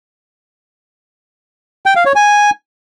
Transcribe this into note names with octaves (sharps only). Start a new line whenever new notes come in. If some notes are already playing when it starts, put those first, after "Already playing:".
G5
F5
C#5
G#5